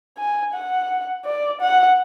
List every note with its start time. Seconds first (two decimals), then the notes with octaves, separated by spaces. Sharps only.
0.18 G#5
0.54 F#5
1.26 D5
1.61 F#5